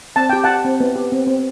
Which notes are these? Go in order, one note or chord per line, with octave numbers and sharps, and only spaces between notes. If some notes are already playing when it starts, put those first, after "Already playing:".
C4 A5
G4 G5
G4 F#5 A5
C4
B3
G4
C4
C4